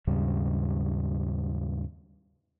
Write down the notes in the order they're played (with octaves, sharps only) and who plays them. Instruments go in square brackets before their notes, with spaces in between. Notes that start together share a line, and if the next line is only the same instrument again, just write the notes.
[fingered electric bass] D#2 G#2 C#3 G3